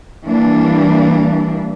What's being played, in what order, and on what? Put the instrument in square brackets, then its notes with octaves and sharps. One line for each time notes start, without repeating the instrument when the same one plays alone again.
[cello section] E3 G3 A#3 D4